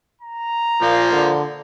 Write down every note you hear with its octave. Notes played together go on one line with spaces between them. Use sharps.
A#5
A#2 F3 A#3
D3